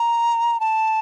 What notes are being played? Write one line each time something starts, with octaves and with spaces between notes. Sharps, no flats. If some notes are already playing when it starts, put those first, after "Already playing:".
Already playing: A#5
A5